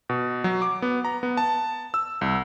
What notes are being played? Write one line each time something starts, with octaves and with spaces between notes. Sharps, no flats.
B2
F#3
D6
B3
A#5
B3
A5
E6
C2